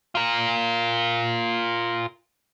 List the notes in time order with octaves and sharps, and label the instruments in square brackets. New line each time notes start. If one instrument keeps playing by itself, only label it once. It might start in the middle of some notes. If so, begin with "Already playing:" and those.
[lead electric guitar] F4 A#4